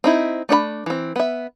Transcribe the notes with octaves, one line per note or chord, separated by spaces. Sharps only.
C4 D#4 E4
A3 D4 C5 B5
E3 C4
B3 E5